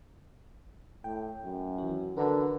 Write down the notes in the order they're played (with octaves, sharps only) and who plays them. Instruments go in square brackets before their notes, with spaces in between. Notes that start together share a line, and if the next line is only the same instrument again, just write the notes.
[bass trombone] A2 [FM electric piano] G5
[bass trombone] F#2
[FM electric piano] E3 F#4
[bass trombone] D3 [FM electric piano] A#4 B4 A#5